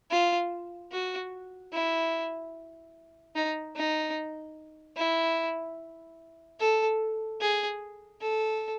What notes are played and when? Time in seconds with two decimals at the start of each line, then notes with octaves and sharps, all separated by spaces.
0.11 F4
0.92 F#4
1.73 E4
3.36 D#4
3.76 D#4
4.97 E4
6.60 A4
7.41 G#4
8.22 A4